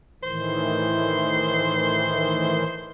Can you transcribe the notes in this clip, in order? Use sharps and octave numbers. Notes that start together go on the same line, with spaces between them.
A2 D#3 E3 C5